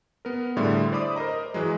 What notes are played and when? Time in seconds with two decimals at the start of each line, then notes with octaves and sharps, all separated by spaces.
0.25 B3 A#4
0.57 A2 D3 G3 G#4 E5 C6
0.92 C5 D5 B5 D6 D#6
1.16 A#4 C5 D#5 A#5
1.54 E3 F#3 G#3